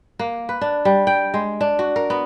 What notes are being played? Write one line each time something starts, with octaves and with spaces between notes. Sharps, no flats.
A#3
B4
D4
G3
G5
G#3
D4
F#4
A#4
B3